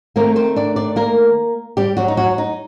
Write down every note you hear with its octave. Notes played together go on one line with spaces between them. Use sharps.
D#3 A3 A#3 C4 A#4
C4 C5
D4 D5
D4 D5
A#3 A#4
G3 G4
F#3 F#4
D#4
F#3 F#4
D#4